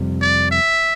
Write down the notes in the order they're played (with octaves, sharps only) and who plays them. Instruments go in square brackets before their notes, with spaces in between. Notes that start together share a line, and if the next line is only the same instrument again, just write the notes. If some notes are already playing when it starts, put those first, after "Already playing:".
Already playing: [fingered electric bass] F2 C3 G3
[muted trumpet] D5
E5